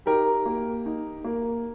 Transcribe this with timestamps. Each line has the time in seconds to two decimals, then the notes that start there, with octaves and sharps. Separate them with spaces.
0.06 D#4 G4 A#4
0.46 A#3
0.86 D#4
1.24 A#3